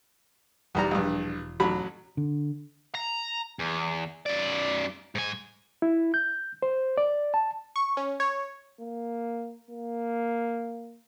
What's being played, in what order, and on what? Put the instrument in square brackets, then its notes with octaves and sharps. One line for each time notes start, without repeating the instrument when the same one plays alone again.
[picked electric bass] E1 [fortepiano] E2 G3 A#5
[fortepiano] A#1 G2
A1 F#3 B5
[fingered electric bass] D3
[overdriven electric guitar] A#5
E2
F#2 D5
G#2 G#5
[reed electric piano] E4
G6
C5
D5
A5
[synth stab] C#6
C#4
C#5
[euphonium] A#3
A#3